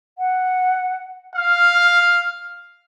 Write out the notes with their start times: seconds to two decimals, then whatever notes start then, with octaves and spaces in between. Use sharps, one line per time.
0.18 F#5
1.35 F5 F6